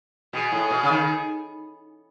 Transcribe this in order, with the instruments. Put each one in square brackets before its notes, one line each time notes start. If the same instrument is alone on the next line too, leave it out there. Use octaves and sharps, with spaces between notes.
[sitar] B2 [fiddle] G#4
[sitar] A2
B2
C#3
D#3